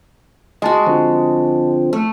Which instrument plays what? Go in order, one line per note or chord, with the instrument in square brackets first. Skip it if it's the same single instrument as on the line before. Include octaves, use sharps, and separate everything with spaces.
[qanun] G#3 F#4 [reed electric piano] D#5 A5
[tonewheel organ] D3 F3 C4
[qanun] A3